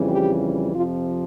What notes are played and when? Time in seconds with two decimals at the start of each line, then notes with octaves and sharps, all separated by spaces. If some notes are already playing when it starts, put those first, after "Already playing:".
Already playing: F2 C#3 E3 G3
0.10 G4
0.74 F2 C3 F3 F4